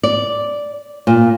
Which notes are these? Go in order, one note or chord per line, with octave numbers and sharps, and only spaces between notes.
D5
A#2